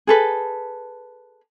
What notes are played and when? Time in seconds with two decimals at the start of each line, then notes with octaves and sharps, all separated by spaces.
0.07 G#4 A4 B4